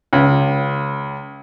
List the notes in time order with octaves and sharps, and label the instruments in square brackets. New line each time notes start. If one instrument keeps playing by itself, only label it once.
[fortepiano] C#2